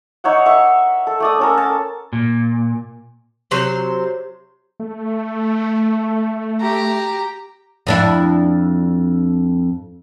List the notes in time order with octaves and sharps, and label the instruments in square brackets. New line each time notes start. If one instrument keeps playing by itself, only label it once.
[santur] D#4 C#5 E5 F#5
E5 C#6
A4
A3 D5 D#6
C#4 A4 A#4
A5
[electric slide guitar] A#2
[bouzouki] C3 F#3 C5
[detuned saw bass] A3
[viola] G4 A#5
[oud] F2 D4 E4